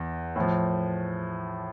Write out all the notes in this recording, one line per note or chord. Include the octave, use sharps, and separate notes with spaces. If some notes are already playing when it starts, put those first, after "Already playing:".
Already playing: E2
A2 F3